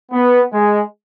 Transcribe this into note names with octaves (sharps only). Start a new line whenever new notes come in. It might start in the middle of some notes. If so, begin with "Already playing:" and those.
B3
G#3